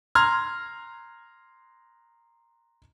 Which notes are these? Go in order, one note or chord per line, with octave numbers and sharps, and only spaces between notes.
A#5 C6 F6 G#6